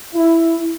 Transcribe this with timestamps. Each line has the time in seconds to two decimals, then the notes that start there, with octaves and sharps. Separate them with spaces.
0.14 E4